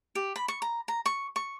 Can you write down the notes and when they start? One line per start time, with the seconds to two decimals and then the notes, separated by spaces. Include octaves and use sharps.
0.15 G4
0.36 B5
0.48 C#6
0.62 A#5
0.88 A#5
1.06 C#6
1.36 C#6